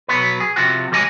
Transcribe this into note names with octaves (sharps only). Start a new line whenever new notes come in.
B1 F#3 B3 B4
G#4
C3 F3 F#4
E3 G4 D#5 G#5